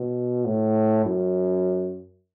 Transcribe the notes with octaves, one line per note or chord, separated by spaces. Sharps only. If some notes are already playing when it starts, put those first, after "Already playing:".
Already playing: B2
A2
F#2